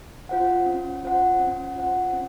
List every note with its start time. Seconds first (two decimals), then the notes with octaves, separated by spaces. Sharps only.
0.29 F4 C5 F#5
0.66 C#4
1.03 F4 C5 F#5
1.39 C#4
1.76 F4 C5 F#5
2.13 C#4